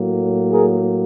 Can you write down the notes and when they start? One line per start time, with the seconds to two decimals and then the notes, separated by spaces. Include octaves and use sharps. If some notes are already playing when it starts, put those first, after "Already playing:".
Already playing: A2 F#3 A#3
0.51 G#4 A#4